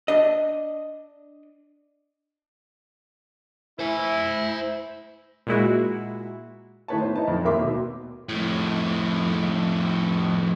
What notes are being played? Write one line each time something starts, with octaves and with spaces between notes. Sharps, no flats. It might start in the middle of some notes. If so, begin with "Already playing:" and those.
D4 D#5
E4 C5 G#5
A#2 G#3 E4 F#4
A2 D#3 B4 C#5 A5
B3 C5
D#4 E4 A5
F2
D#2 A#3 A#4 E5 C6 D6
B2
F2 A2